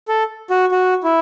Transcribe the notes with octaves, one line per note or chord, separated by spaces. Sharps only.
A4
F#4
F#4
E4